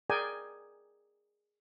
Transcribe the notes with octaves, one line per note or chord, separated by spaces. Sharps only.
G#4 A#4 D5 G5 G#5